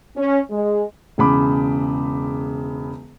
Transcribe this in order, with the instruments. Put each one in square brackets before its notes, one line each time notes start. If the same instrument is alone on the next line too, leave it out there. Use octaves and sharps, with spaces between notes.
[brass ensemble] C#4
G#3
[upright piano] E1 C#3 B5 D6